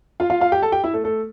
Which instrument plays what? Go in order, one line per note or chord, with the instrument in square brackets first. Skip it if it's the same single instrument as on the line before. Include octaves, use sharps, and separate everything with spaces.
[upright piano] F4 F5
F4 F5
F4 F5
G4 G5
A4 A5
G4 G5
E4 E5
A3 A4
A3 A4